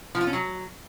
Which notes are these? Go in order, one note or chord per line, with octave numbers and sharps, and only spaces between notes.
F3
F4
C#4
F#3